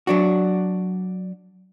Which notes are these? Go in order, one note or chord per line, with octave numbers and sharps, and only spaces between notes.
F#3 D4 F#4